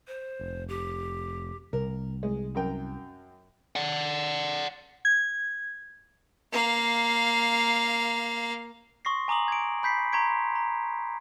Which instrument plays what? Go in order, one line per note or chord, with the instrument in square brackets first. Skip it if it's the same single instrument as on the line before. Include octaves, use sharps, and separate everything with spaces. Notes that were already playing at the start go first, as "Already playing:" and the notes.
[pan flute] C5
[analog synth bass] F1
[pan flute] G4
[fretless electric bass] C2 [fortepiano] A#4
[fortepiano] G#3
F#2 A#4 G5
[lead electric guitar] D5 F#5
[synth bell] G#6
[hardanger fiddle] A#3 F5
[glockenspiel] C6 C#6 D#6 A#6 C7
G#5 A#5 D6 D#6 F#7
G#6 D7
B5 G6 B6 C7
A#5 C6 C#6 G#6 B6 D7
A#5